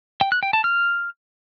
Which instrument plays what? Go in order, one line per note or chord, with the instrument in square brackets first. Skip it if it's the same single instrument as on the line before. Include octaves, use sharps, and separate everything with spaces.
[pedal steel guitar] G5
F#6
G5
A5
F6